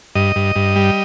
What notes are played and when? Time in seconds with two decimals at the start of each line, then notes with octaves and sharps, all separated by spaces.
0.15 G2 D#5
0.36 G2
0.56 G2
0.76 G3